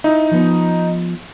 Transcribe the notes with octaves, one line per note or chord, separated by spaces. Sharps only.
D#4 E4 E5
F3 B3